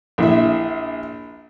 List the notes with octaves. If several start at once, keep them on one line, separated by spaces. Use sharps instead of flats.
A#1 E4 E5